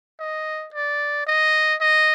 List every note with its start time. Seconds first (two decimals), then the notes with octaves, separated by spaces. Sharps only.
0.20 D#5
0.74 D5
1.27 D#5
1.81 D#5